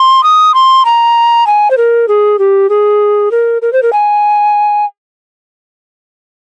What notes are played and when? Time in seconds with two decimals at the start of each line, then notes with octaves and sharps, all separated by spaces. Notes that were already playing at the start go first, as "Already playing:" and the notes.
Already playing: C6
0.23 D#6
0.54 C6
0.85 A#5
1.47 G#5
1.71 C5
1.77 A#4
2.08 G#4
2.39 G4
2.69 G#4
3.31 A#4
3.62 A#4
3.73 C5
3.83 A#4
3.93 G#5